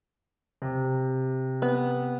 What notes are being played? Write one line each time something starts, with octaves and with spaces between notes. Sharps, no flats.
C3
B3